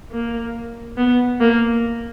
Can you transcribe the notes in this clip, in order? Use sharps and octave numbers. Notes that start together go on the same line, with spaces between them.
A#3
B3
A#3